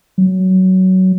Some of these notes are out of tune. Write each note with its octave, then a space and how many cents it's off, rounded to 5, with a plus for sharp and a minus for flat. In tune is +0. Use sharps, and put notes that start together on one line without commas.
F#3 +15